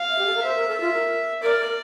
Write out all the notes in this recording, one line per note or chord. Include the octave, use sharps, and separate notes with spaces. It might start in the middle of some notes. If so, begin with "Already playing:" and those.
Already playing: F5
E5
G4
A4
A#4
C5 E5
A#4
A4
F4
A#4
A#4 D5
A#4